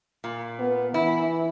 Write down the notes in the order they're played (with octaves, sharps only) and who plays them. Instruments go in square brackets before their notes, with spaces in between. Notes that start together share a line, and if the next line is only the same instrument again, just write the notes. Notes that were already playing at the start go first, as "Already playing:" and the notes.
[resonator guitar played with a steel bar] A#2
[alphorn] B3
[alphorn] E3 [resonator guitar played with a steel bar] E4